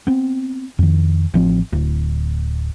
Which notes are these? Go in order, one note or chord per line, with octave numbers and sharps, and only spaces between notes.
B3 C4
F2 D#3
A1 F3 C4
D1